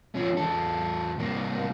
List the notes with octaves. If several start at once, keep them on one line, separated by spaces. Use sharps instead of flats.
F3 C#4
E2 A4
C2 A#3